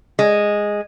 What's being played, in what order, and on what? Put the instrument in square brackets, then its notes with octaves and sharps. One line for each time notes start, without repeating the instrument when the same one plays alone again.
[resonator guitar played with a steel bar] G#3